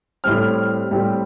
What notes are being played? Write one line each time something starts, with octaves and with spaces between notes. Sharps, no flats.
A2 G3 C4 F6
A2 G3 C4